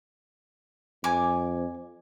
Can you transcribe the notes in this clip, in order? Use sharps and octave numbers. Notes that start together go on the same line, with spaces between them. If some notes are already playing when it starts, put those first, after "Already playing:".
F2 G#5 D6